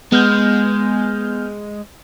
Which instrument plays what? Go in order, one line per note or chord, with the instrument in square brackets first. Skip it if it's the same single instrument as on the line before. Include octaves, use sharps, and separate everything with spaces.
[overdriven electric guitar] G#3 [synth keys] B3 F6 G6